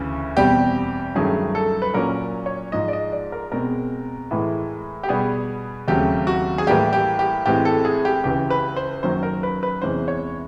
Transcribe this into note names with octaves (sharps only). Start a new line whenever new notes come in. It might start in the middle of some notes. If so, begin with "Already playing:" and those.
Already playing: D2 C#3 E3
E2 B2 G3 C4 G4
G2 D#3 F#3 A3 C#4 G#4
A4
B4
A#2 F#3 A#3 C#4 A#4
C#5
G#2 F3 G#3 D#5
D5
D#5
D5
A#4
B2 G#3 C4 A#4
A2 E3 G#3
G4
B2 G3 B3 G#4
D#2 C#3 F#3 A3 C4 G4
F#4
G#4
A2 E3 G3 A#3 G4
G4
G4
A2 E3 G#3 C4 G4
A4
G#4
G4
C#2 C#3 E3 G4
B4
C5
F#2 D#3 F#3 A#3 C#4 C5
A#4
B4
B4
E2 C3 E3 G#3 C#4 C5
C#5